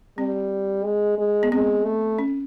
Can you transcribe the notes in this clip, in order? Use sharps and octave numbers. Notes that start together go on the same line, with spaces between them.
G3 C4
G#3
G#3
B3
G#3 C4
A3
C#4